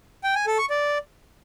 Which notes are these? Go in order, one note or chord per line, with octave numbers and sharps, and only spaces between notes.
G5
G#5
A4
C#6
D5